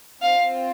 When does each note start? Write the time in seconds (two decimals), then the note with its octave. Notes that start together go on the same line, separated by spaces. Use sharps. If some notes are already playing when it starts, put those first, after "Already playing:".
0.21 C4 F4 F5